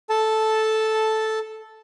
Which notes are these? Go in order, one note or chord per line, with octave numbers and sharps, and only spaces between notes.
A4 A5